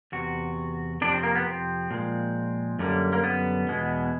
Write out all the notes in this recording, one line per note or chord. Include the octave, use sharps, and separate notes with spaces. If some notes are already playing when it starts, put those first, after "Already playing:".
E2 C3 F#4
F2 C3 F3 D4
C4
A#3
B3
C4
A#2 F3 G#3
F#2 D3 G3 A#3
A#3
B3
E2 B2 G#3